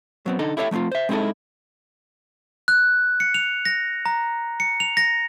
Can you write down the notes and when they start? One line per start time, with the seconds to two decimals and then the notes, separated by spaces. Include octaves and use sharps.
0.26 F#3 B3 C4
0.39 D3 D#4 A4
0.57 E4 G4 A4 C#5 E5
0.71 F3 A3 A#3 C4 F4
0.92 C5 E5
1.09 G#3 C4 D#4 E4 G#4 A4
2.68 F#6
3.20 C#7
3.34 F7
3.65 A#6
4.06 A#5
4.60 C#7
4.80 F7
4.97 A#6